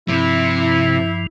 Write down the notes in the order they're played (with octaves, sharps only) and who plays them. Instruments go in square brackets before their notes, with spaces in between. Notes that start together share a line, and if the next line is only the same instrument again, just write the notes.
[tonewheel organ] G2 F3 [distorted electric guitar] C3 [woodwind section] E4